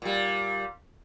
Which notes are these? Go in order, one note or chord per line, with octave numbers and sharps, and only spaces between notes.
A#2 G3